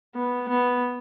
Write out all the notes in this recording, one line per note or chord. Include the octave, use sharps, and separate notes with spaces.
B3
B3